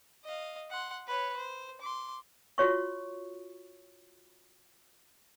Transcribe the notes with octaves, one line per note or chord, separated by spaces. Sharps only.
D#5 F5
F#5 C6
B4 C#5
C5
C6 D6
F4 F#4 C#5 C#6